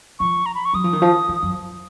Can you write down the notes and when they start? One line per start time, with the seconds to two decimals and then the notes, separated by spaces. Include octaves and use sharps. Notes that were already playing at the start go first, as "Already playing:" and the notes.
0.19 F3 C#6
0.46 A#5
0.55 B5
0.65 C#6
0.73 F#3 D#6
0.84 F3
0.93 D#3
1.02 F3
1.29 D#3
1.43 F#2